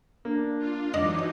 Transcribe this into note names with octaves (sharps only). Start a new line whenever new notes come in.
A#3 D4
F4
E3 F#3 D4 D#4 D#5 D6